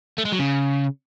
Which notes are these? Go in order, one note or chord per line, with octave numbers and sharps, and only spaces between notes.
A3
G#3
F#3
C#3